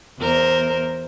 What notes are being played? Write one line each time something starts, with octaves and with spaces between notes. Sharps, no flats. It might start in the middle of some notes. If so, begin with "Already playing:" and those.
E2 A#4 C5